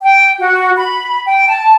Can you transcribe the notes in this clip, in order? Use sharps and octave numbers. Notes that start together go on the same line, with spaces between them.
G5
F#4
B5
G5
A5